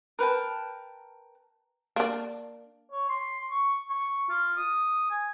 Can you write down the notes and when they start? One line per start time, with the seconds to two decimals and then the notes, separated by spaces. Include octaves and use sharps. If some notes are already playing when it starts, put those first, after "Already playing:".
0.19 A#4 B4 G5 A5
1.96 A#3 D4
2.92 C#5
3.09 C6
3.51 C#6
3.90 C#6
4.29 F4
4.57 D#6
5.11 G#5